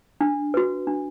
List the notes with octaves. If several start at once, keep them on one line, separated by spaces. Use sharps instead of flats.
D4
F#4 B4
D4